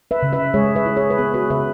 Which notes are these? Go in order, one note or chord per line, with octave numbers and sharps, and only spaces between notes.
B4 E5
C#3
B4 E5
G#3 G#4 C#5
B4 E5
E4
G#4 C#5
B4
B3 G#4
F#4 B4
C#3 B4 E5